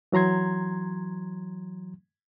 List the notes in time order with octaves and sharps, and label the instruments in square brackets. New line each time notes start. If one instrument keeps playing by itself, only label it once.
[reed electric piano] E3 F#3 A#5 C6 G#6